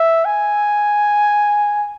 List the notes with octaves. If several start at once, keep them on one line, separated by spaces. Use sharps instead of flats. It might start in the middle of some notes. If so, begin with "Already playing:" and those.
Already playing: E5
G#5